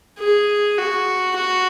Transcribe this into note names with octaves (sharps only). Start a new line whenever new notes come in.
G#4
F#4
F#4